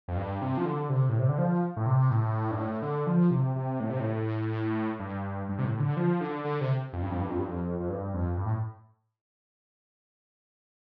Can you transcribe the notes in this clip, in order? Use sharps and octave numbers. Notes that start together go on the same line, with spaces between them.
F2
G2
C3
F3
D3
C3
A2
C3
D3
F3
A2
C3
A2
G2
A2
D3
F3
C3
C3
A2
C3
A2
G2
G2
C3
A2
D3
F3
D3
D3
C3
F2
G2
F2
G2
F2
G2
F2
F2
G2
F2
G2
A2